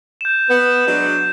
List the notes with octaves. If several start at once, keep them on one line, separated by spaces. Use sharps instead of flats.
G6 E7
B3 B4
F#3 G#3 D4